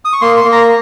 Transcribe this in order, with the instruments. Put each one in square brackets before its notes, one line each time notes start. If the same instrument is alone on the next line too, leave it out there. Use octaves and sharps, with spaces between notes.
[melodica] D#6
C#6
A#3 C6
C6
A#3
A#5